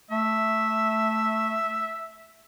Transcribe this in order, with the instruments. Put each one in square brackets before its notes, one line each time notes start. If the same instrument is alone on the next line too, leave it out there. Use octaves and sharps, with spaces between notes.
[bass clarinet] A3 [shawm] E5